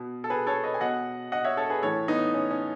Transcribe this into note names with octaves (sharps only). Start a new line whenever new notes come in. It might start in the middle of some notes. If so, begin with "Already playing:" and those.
Already playing: B2
A4
G#4 B4
A4 C#5
B4 D#5
G#5
B2 D#5 F#5
D#5 F#5
C#5 E5
A4 C#5
G#4 B4
A2 E3 A4 C#5
B3 D#4
C#4
C#4